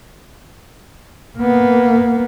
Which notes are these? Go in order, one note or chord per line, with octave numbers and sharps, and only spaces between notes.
A#3 B3